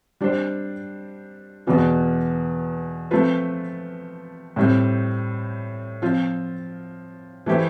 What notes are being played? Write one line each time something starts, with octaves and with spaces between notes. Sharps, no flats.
G3 D4 G4 C5
E2 B2 B3 F4
F3 A3 C4 F4 B4
A2 G3 C4
F3 C4 F4
E3 A3 E4 G4 C5